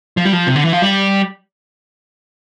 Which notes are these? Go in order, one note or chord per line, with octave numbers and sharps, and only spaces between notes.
F3
G3
F3
C3
D3
E3
F3
G3